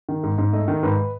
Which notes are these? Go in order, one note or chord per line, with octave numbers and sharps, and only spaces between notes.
D#3
G#2
G#2
A3 D#5
D#3
G#2 B4